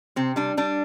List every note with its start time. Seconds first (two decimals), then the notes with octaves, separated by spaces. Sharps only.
0.16 C3 C4
0.36 G3 D4
0.57 G3 D4